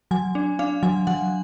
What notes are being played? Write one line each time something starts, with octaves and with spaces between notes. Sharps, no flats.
F#3 G#5
D4
D4 F5
F#3 G#5
F#3 F#5